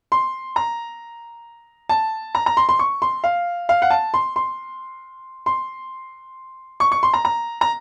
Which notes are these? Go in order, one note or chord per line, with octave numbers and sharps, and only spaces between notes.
C6
A#5
A5
A#5
A#5
C6
C6
C#6
C6
F5
F5
F#5
A5
C6
C6
C6
C#6
C#6
C6
A#5
A#5
A#5